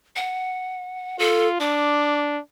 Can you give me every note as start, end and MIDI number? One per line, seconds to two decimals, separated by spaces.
0.16 1.19 78
1.19 1.57 65
1.19 1.48 69
1.60 2.40 62
1.60 2.20 86